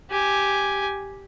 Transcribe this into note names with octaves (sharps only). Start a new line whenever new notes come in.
G4 G#5